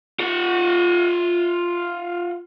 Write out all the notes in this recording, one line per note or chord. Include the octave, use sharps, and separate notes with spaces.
F4 F#5